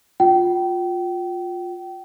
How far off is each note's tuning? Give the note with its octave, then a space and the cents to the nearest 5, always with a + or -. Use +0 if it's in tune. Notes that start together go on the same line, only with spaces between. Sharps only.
F4 +20 G5 -30